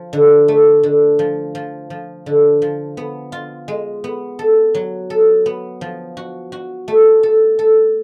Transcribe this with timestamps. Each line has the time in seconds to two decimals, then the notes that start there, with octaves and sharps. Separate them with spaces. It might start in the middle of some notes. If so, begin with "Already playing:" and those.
Already playing: F3
0.13 D3
0.48 A3
0.83 D3
1.19 F3
1.55 F3
1.90 F3
2.26 D3
2.62 F3
2.97 B3
3.32 F4
3.68 G#3
4.04 B3
4.39 A4
4.75 F#3
5.10 A4
5.46 B3
5.81 F3
6.17 F#4
6.52 F#4
6.88 A3
7.23 A4
7.59 A4